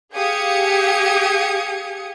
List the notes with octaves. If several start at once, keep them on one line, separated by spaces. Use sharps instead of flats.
G4 G#4 F5 D#6 G#6 C#7